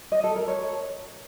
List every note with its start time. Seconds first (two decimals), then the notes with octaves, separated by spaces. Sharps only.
0.12 D#5
0.24 A4
0.36 A#4
0.48 C#5